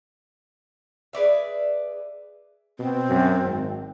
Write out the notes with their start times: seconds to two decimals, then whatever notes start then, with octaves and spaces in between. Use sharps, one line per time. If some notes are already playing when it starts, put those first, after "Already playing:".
1.13 G#4 B4 D5 E5
2.79 B2 C4
3.10 F#2
3.44 G#1